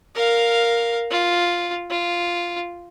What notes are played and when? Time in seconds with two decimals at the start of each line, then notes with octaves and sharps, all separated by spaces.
0.15 A#4 F5
1.11 F4
1.90 F4